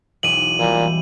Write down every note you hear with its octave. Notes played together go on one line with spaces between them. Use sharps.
E1 B1 D7 D#7 F#7
A#2 E3 G3